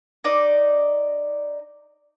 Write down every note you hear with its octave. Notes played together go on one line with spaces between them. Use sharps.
D#4 D5